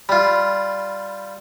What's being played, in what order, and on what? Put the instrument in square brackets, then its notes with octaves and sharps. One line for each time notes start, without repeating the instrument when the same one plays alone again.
[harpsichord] G3 F4 [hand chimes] B5